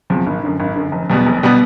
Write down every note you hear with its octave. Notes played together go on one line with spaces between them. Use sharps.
E2 C3 F3
G#1
F#2 D3
G#1
F#2 D3
F1
E2 B2 G3 B3
F1
B2 G3 B3